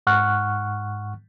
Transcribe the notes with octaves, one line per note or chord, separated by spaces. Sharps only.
G#2 F#5 C#6 F6 F#6